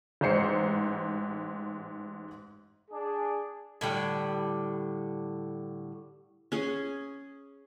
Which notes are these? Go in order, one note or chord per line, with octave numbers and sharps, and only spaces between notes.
A1 G#2 C5 C7 C#7
D4 G#4
A2 D3 G3
C#4 G#4